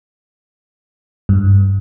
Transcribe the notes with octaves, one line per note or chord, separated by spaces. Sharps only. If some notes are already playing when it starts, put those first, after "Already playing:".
G2